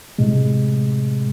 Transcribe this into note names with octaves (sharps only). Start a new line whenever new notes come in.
A2 C3 G#3